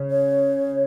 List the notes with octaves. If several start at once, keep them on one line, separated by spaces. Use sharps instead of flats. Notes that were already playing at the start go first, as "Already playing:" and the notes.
Already playing: C#3
C#5